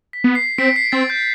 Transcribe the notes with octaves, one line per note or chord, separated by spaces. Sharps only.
B6
B3
C7
C4 B6 D7
C7
C4 A6
G6